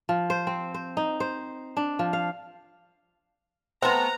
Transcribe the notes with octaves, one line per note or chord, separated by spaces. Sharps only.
F3
C5
C4
C5
D#4
C5
D4
F3
F5
A3 B3 C4 B4 C5 F#5 A#5